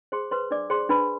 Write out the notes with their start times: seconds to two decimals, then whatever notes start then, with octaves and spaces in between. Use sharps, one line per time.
0.12 G#4 C5 C6
0.31 B4 C5 C6
0.51 D4 D5 D6
0.70 G#4 C5 C6
0.89 D4 B4 B5